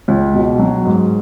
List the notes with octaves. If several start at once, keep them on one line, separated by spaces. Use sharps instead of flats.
C#2
B2
F#3
G#2